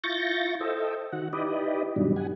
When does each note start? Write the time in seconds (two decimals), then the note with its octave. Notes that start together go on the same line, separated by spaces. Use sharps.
0.04 E4 F4 C#6 G6 A6 A#6
0.60 A4 C5 D#5 E5 G5
1.12 D#3 F#4 F#5
1.33 D#4 E4 G4 B4 D5 D#5
1.96 G2 B2 D#3 F#3 G3 D4
2.16 G4 F#5 G#5